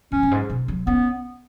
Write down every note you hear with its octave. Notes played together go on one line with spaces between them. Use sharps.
F#2 C#4
F#2
G#2
B2
F#3
B3 C#4